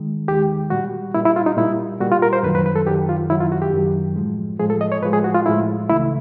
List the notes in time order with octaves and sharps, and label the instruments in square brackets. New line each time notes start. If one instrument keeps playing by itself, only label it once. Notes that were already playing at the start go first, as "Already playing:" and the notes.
Already playing: [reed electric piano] D#3 G#3
D#2 D#3 G#3 G4
A#2 G3 F#4
A#2 G3 E4
E4
F4
D#4
A#2 G3 E4
A#2 G3 F#4
F4
A#4
C5
F#2 D#3 F#3 B4
B4
B4
A4
F#2 D#3 F#3 G4
F4
F#2 D#3 F#3 E4
F4
F#4
G4
F#2 D#3 F#3
A2 F3 G#3
A2 F3 G#3 G#4
A4
D#5
C#5
A2 F3 G#3 B4
G#4
F#4
F4
A2 F3 G#3 E4
C#2 C#3 E3 A3 E4